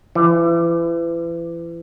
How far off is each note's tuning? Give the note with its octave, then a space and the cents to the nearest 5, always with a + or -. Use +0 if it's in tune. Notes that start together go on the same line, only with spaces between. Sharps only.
E3 +35